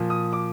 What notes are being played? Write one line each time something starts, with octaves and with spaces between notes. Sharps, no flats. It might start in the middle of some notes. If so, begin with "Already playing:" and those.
Already playing: A#2 F3
D#6
D6